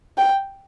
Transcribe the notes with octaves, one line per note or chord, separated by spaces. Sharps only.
G5